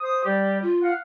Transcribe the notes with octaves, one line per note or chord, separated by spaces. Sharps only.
C5 D#6
G3 G4 D5
F4
F5 F#5